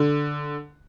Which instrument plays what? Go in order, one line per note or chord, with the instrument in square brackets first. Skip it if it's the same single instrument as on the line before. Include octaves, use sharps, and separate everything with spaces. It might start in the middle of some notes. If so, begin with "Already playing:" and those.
Already playing: [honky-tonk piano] D3